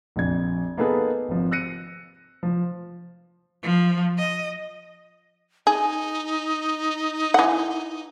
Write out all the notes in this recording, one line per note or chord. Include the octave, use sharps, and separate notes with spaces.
A#1 F2 G#6
A#3 B3 D#4 G#4 A4 B4
G#1 F3
E6 F#6 A#6 C#7 D#7
F3
F3
D#5
D#4 G#4
E3 F#5